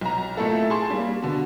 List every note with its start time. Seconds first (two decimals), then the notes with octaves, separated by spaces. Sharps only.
0.01 B1 A#5
0.37 A#2 A3 E4 A4
0.70 G#4 A5 C6 C#6
0.90 G3 A#3
1.22 B2 D3